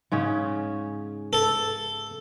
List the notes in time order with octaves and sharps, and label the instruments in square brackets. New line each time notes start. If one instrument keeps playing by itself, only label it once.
[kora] G#2 C#3 C#4
[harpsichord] A4